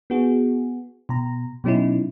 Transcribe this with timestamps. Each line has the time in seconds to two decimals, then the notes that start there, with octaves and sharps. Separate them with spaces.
0.10 B3 F#4 G#4
1.09 B2 A#5
1.64 B2 F#3 C#4 D#4 E4